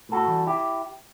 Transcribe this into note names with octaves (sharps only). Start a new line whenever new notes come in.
A2 F#4 A4
E3 G3
E4 G4